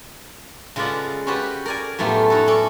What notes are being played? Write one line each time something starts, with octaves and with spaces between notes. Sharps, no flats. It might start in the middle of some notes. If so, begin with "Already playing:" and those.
C#3 G#3 F4 B4 D5 F#5
C#4 F#4 G4 B4 C5 D5
A#4 D5 G#5
F#2 A2 A3 B3 F4 G4
D#4 F#4 A4
C#4 A4 D5